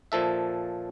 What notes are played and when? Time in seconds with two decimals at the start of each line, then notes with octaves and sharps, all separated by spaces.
0.12 A#2 F3 A4 E5